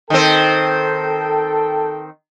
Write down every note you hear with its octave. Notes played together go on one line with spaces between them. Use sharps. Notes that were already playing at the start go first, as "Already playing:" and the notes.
D#3 C4 A4 G5